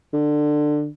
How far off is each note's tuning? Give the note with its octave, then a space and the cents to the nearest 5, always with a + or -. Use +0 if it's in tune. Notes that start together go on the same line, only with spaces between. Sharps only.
D3 +20